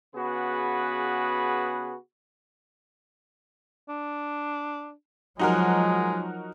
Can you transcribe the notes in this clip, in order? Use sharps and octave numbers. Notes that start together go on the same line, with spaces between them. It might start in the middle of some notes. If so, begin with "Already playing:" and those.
C#3 B3 F#4 G#4 B4
D4
F3 F#3 G#3 D#4 F#4 A#4